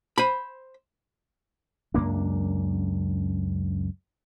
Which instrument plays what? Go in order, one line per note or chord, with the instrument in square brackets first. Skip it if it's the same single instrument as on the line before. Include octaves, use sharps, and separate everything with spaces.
[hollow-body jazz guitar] C5 B5
[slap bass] C#2 F#2 A#3 D4